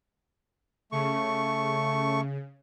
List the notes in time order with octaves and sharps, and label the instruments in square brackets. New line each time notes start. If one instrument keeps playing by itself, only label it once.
[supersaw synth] C#3 [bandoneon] A3 C#6